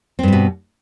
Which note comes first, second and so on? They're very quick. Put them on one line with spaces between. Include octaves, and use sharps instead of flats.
C4 G2 G3 B2